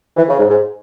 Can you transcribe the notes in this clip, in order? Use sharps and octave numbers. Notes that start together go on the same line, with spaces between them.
E3
C#3
G#2
G#2